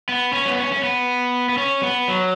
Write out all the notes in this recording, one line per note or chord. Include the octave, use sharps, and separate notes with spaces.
B3
C#4
B3
C#4
C#4
B3
B3
C#4
B3
F#3